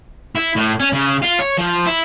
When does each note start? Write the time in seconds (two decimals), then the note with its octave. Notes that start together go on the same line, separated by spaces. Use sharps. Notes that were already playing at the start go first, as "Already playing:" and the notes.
0.35 E4
0.56 A2
0.80 C#4
0.93 C#3
1.22 F4
1.39 C#5
1.58 F3
1.86 E4